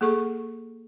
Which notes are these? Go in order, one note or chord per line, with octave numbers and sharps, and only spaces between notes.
A#3 G#4 A4 C#6